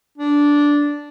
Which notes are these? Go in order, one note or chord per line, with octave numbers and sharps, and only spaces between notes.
D4